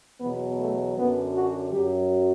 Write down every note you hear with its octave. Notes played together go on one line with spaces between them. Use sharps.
E2 B2 F#3 B3
A3
F#2 D3 F#3 B3
F#4
F#2 F#3 G4